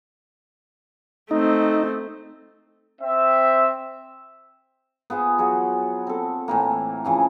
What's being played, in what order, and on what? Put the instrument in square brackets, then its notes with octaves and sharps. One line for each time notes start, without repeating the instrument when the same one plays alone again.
[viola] A3 C4 [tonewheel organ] D#4
[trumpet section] C4 E5
[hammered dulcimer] B3 F4 G#4 C5
F#3 F#4 G#4
C4 A4
A2 E3 A#3
C#3 E3 F3